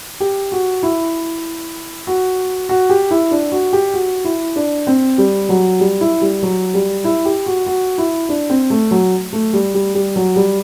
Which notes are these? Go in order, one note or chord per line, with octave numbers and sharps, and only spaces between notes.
G4
F#4
E4
F#4
F#4
G4
E4
D4
F#4
G4
F#4
E4
D4
C4
G3
F#3
G3
E4
G3
F#3
G3
E4
G4
F#4
F#4
E4
D4
C4
A3
F#3
A3
G3
G3
G3
F#3
G3